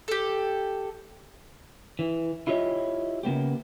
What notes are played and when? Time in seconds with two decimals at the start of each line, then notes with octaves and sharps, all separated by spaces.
0.08 G4 A4
1.99 E3
2.47 E4 F4 G4 C#5 D#5
3.23 C#3 A#3 B3 G4